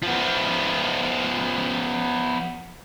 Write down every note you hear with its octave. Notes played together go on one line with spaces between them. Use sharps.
F3 B3